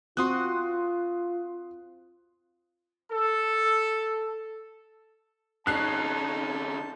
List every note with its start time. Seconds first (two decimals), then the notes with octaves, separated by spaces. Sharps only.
0.17 C4 F4 F#4 C6 D#6 F#6
3.12 A4
5.67 D3 C#4 D#4 A5 F#6 C7